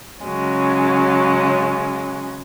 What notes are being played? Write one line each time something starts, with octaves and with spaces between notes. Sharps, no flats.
C#3 F#3 G#3 C#4